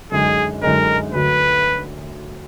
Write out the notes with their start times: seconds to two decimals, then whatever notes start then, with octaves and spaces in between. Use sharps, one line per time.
0.12 F#2 D3 G#3 D#4 G#4
0.62 F#2 D3 G#3 D#4 A#4
1.12 D2 D3 F#3 B4